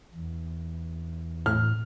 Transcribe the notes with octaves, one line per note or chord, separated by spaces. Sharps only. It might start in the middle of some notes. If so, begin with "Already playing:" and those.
E2
A2 F6